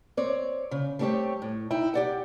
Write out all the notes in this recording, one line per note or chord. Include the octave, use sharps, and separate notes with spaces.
C4 C#5 D5
C#3
G3 A3 C4 G4 C#5
A2
D#4 E4 G5
G4 D5 F#5